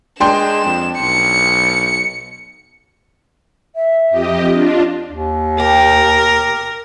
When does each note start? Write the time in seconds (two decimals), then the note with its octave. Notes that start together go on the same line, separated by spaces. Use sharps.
0.20 G#3 D4 G5 C6 E7
0.65 F2
1.00 B1 C#7
3.76 E5
4.10 F2 G4 D#5
4.52 D4 F4 D#5
5.11 D#2
5.60 G4 A#4